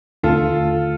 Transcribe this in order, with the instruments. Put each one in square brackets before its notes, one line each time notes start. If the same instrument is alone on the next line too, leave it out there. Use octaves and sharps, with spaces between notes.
[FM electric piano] D#2 D3 A3 [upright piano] F4 A4